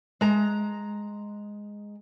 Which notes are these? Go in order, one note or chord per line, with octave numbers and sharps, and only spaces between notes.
G#3 A#5